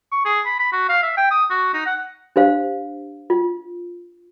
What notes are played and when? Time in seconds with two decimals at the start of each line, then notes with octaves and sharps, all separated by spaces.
0.12 C#6
0.25 G#4
0.46 B5
0.60 B5
0.73 F#4
0.89 F5
1.03 E5
1.17 G5
1.31 D#6
1.50 F#4
1.74 D#4
1.86 F#5
2.36 D4 G4 C5 F5
3.30 F4